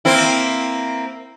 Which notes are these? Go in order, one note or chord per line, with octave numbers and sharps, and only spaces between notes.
A#3 C4 E4